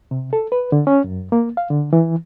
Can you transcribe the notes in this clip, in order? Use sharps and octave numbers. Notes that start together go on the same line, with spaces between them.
C3
A4
B4
D3
C#4
F#2
A#3
F5
D3
E3